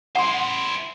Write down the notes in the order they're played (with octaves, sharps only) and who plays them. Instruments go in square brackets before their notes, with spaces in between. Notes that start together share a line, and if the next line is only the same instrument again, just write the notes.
[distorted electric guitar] E4 C5 [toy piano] F#5 B5 C6